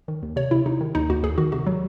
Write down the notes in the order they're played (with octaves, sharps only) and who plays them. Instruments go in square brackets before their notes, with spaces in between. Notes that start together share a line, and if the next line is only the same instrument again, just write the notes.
[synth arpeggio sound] D#3
D#2
C3 C#5
C3 E4
C3 D#4
D#3
D#2 D#4
D#2 F#4
D#2 G#4
D#3 F#4
C3 F#4
F#3